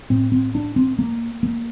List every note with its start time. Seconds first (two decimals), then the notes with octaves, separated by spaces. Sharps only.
0.10 A2 C4
0.32 C4
0.55 D4
0.76 C4
0.99 A#3
1.43 A#3